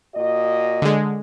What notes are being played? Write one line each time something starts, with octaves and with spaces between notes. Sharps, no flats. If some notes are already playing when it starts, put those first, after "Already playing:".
A#2 F#4 D#5
D3 G#3